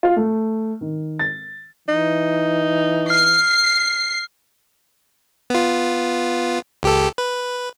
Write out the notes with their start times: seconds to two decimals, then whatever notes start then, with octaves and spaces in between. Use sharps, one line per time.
0.03 F4
0.16 A3
0.81 D#3
1.19 A6
1.88 E3 D#4
3.10 F6 C7
5.50 B3 F4
6.83 C#2 G4 A4
7.18 B4